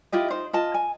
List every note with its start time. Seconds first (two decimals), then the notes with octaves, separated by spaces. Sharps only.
0.12 E4 F4 G4 D#5
0.30 D#4 C5
0.53 F4 D#5 A5
0.74 G#5